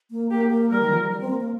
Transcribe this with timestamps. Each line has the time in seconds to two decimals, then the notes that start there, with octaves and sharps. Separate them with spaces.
0.11 A#3
0.31 A#3 G4
0.51 A#3
0.70 G3 A#4
0.81 D#3
0.91 F3
1.00 G3
1.10 G3
1.21 C4
1.30 A#3
1.40 A#3